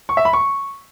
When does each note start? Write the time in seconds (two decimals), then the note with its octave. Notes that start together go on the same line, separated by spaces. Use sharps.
0.09 C#6
0.17 E5
0.25 B5
0.33 C#6